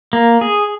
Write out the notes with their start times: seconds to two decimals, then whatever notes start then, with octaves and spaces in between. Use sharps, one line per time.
0.13 A#3
0.41 G#4